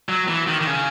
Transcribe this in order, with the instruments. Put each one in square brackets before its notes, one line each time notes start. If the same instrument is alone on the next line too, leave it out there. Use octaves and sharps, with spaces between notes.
[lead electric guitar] F#3
E3
D#3
D#3
C#3